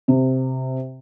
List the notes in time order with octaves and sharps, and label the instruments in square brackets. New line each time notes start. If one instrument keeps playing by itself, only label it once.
[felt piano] C3